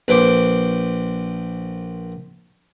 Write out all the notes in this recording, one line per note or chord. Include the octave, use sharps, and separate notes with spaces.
A#1 B4 C5 D6